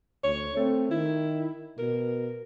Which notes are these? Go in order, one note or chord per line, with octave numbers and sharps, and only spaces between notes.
D2 C#5
A3 C4
D#3 E4
B2 A#4